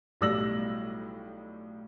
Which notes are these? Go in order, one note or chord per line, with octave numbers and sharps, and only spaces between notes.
B1 A2 G3 E6 A#6 F#7